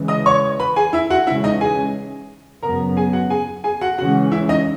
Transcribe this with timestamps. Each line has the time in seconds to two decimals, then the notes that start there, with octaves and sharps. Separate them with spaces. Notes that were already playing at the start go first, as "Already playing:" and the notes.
Already playing: C#3 E3 G#3
0.08 D#5 D#6
0.26 C#5 C#6
0.60 B4 B5
0.76 G#4 G#5
0.93 E4 E5
1.10 F#4 F#5
1.27 C#3 E3 G#3 C#4 E4 E5
1.44 D#4 D#5
1.61 G#4 G#5
2.63 F#2 C#3 F#3 B3 A#4 A#5
2.97 G#4 G#5
3.13 F#4 F#5
3.30 G#4 G#5
3.64 G#4 G#5
3.81 F#4 F#5
3.98 C#3 E3 G#3 C#4 F#4 F#5
4.32 E4 E5
4.49 D#4 D#5